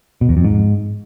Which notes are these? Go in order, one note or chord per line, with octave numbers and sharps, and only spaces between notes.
B2
E2
F2
G#2